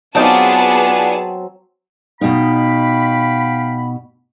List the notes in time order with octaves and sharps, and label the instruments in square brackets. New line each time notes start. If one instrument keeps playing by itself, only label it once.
[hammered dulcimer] F#3 C4 [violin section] B3 G#4 A5 [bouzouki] D4 D#4 F4
[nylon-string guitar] B2 D#4 [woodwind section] F5 G5 B5